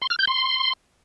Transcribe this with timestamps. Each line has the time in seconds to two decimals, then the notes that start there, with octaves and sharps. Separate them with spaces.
0.02 C6
0.10 F6
0.19 G6
0.27 C6